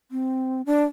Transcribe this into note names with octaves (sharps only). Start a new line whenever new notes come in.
C4
D4